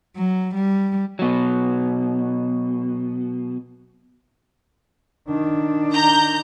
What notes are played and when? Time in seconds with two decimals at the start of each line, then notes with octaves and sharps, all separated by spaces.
0.16 F#3
0.55 G3
1.19 B2 F#3
5.28 D#3 D4
5.94 A#5 G6